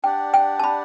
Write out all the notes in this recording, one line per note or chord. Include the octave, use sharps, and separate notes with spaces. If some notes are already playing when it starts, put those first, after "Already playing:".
D4 G4 D5 F#5 G5
G5
A5
B5